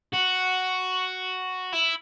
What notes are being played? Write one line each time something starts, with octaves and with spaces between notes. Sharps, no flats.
F#4
E4